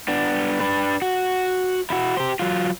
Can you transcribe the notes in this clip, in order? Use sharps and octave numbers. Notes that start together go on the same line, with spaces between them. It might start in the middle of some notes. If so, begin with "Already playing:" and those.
B3 D4
D4 B4
F#4
E4 F#4
G4 C5
F#3 F4